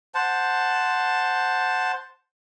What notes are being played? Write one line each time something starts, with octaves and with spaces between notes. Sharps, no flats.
C5 F#5 A5